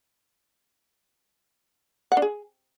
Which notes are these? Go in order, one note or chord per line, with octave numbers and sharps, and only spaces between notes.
F#5
D4
G#4